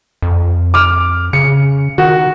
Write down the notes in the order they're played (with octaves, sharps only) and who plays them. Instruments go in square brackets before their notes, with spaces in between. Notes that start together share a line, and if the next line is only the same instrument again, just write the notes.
[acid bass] F2
[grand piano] D6 F6
[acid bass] C#3 [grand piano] C#7
[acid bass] D#3 [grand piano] F#4